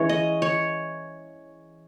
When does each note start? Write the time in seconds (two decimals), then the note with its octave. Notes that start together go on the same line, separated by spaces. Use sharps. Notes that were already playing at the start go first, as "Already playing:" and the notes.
Already playing: E3 G#3 C#4 C#5
0.09 D#5
0.42 C#5